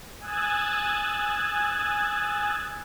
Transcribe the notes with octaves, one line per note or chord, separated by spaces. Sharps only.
G#5 D#6 E6 F#6 G#6 A6